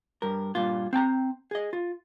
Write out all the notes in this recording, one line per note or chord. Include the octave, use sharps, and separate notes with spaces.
G2 A#4
G2 A#2 F4
C4 G5 A5 A#5
G#4 D#5
F4